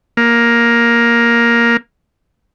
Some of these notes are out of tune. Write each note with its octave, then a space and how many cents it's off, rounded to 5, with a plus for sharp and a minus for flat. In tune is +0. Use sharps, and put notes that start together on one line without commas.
A#3 +10